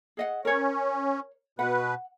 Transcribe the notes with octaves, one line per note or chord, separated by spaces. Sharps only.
G#4 D#5 F#5
C#4 A#4 C#5
B2 B4 F#5